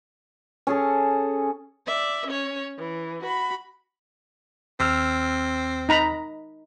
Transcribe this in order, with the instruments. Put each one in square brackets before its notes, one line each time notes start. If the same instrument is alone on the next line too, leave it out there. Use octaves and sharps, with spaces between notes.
[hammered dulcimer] C#4 G#4 A4
[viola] D5 E5
C#4 C#5
E3
F#4 B5
[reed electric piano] D#2 E6 F6 [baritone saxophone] C4
[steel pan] D#4 A#5 B5